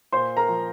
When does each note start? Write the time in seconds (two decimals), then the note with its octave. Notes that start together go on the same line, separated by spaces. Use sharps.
0.13 A#2 C5 C6
0.37 A#4 A#5
0.48 F3